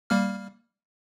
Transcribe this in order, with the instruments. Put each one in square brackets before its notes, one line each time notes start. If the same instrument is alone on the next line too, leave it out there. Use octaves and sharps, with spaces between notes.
[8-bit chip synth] G3 A#3 F6